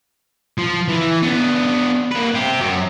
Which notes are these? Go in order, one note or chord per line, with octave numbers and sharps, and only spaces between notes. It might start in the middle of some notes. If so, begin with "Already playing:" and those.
F3
E3
B3 D4
A#3 B4
C4 G4
F#2 F#3